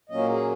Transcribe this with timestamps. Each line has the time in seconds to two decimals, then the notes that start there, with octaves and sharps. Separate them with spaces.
0.10 A#2 F#3 A#3 C#4 D#5
0.30 G#4